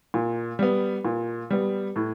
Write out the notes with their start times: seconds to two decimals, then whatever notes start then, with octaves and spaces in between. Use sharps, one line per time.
0.14 A#2
0.59 G3 B3
1.05 A#2
1.51 G3 B3
1.96 A2